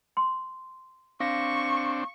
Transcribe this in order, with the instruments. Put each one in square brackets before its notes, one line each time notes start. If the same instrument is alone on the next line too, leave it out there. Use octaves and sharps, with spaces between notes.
[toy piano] C6
[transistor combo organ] C4 D4 [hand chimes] F5 A#6 [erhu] C#6